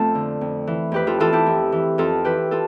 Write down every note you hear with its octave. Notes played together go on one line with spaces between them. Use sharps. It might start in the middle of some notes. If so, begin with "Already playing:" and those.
Already playing: F2 A3 C4 F4 A4
D3
F2
E3
F2 G4 B4
F4 A4
E3 F4 A4
E4 G4
F2
E3
F2 F4 A4
E3 G4 B4
F4 A4